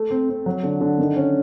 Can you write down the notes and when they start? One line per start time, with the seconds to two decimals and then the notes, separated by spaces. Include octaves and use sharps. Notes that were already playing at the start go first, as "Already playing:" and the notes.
Already playing: A3
0.11 C4
0.29 C4
0.46 F#3
0.63 D3
0.81 D3
0.99 D#3
1.16 C#4